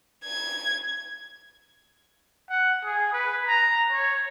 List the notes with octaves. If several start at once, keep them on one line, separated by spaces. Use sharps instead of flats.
G#6
F#5
G#4
B4
A#5
C#5